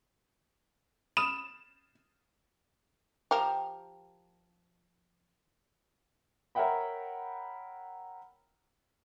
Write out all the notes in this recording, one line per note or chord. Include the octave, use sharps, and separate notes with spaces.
B5 D#6 F6 E7
F3 G4 A#4
A#4 C#5 E5 F#5 G5 B5